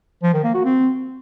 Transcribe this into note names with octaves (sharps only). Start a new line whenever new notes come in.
F3
D#3
A#3
F#4
C4